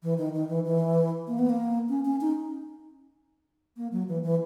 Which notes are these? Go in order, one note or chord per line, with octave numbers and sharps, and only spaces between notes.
E3
D#3
D#3
E3
E3
A#3
B3
A#3
C#4
C#4
D#4
A#3
F#3
E3
E3